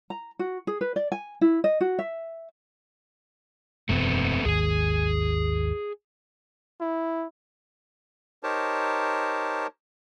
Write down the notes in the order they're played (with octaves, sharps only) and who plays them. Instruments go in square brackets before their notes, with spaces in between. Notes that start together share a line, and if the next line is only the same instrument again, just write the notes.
[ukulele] A#5
F#4
G#4
B4
D5
G#5
E4
D#5
F#4
E5
[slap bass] E1 F#2 [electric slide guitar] A3 B3 C4
[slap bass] G#1 D#2 D#3 [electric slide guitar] G#4 G#5
[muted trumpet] E4
[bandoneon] D#4 G4 A#4 C5 C#5 A5